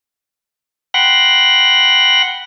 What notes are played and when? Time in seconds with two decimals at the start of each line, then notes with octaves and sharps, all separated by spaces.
0.94 F#5 G5 B5 C6 F#6 A#6